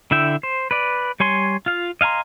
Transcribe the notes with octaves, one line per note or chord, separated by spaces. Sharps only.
D3 E4 E5 G5
C5
B4 D5
G3 C#5 G#5 C6
F4 F5
D#5 F5 G#5 A#5 C6